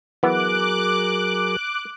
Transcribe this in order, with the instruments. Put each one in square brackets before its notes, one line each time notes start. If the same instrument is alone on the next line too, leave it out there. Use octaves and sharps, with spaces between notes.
[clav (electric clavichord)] E3 B3 [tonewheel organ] F#3 G#4 A#4 [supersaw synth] D6 F#6